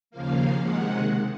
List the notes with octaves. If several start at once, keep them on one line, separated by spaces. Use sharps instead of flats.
D#2 C#3 F3 A#3 F5
C3 D#3 G#3 F#5